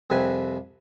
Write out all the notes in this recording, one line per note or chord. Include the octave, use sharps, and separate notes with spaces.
C2 F2 C3 B4 G#5